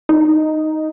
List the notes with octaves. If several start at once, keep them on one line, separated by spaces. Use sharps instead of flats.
D#4